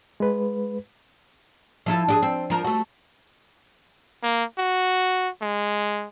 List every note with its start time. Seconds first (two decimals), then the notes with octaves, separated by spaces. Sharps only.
0.20 G#3 B4
1.86 F3 E4 A4
2.08 D4 G4 G#4
2.22 C4
2.50 F3 A#4
2.64 A3 F#4
4.23 A#3
4.58 F#4
5.42 G#3